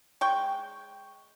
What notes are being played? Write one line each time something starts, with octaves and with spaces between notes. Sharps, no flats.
G#3 G5 C#6